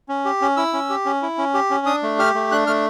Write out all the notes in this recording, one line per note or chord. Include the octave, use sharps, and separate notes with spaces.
C#4
G4
C#4
E4 E6
C#4
G4
C#4
E4
C#4
G4
C#4
D4 D#6
A3
G4 F6
A3
D4 F#6
A3 F6